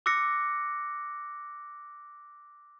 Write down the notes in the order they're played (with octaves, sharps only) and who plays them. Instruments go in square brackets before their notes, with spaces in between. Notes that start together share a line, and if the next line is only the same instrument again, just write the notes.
[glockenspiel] D6 E6 F#6 A#6 C#7